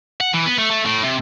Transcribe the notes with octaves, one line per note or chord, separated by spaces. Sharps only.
F#5
E3
B3
A3
A3
A2
C3